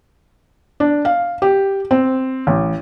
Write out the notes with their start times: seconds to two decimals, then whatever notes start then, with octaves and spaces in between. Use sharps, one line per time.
0.80 D4
1.05 F5
1.42 G4
1.91 C4
2.47 A1